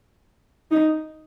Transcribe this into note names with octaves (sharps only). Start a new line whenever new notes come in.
D#4